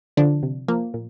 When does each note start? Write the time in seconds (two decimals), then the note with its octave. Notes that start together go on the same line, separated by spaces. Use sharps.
0.17 D3 F3 D4
0.43 C3
0.68 F3 A#3
0.94 A#2